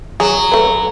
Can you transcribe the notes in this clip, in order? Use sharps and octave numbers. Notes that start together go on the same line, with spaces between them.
F#3 G#4
A3 B4